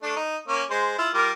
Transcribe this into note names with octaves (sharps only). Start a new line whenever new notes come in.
A3 D4
D#4
A#3 C#4
G#3 C5
E4 F4
G3 F4 A#4